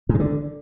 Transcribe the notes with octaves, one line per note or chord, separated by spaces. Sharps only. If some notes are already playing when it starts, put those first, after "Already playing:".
G#2
B2
D3